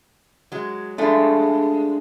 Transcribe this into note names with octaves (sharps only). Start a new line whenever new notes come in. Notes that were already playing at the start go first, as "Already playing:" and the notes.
F#3 G#3
G#3 A3 D4 F4 G#4